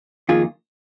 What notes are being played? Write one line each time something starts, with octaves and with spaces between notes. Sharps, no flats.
F2 D#3 A#3 F4 G#4